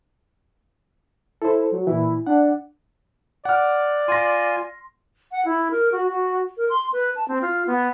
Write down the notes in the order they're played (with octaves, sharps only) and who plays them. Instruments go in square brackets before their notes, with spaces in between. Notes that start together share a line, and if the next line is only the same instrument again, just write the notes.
[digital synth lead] E4 [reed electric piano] A4 C5
[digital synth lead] F#3
[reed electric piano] A#2 E3 [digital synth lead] E4
[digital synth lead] D4 [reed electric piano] F#5
[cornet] D5 [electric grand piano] F#5 F6
[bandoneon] F4 G#5 [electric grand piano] C6 A#6
[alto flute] F#5
E4
A#4
F#4
F#4
A#4
C6
B4
A5
C4
F4
B3